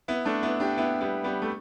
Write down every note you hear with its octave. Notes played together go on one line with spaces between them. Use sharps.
B3 E4
A3 D4
B3 E4
D4 G4
B3 E4
G3 B3
G3 B3
A3